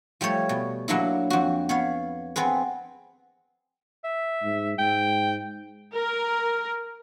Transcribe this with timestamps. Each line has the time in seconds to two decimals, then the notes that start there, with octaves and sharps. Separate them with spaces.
0.21 F3 G3 A3 C#5
0.49 B2
0.88 F#3 A#3 D4 E4
1.30 F2 F#4
1.69 B3 C#5 F5
2.36 B3 C4 G#4 B4
4.04 E5
4.43 G#2
4.78 G#2 G5
5.94 A#4